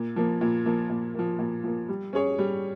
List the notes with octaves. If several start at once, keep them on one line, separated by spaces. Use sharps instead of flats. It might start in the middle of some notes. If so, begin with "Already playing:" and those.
Already playing: A#2
F3 A#3
A#2
F3 A#3
A#2
F3 A#3
A#2
F3 A#3
G3
C#4 G#4 C#5
G3